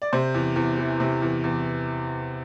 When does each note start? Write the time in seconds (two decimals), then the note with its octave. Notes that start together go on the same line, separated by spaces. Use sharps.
0.02 D5
0.13 C3 C5
0.34 E2
0.56 E2
0.78 E3
1.00 C3
1.22 E2
1.44 E2